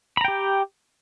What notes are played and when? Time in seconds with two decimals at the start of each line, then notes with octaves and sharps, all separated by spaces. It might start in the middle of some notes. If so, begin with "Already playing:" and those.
0.17 B5
0.21 A#5
0.25 G5
0.28 G4